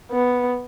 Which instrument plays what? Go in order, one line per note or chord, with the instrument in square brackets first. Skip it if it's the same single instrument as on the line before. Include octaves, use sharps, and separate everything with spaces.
[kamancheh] B3